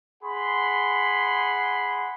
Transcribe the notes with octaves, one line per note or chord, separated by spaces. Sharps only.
G#4 F#5 B5 C6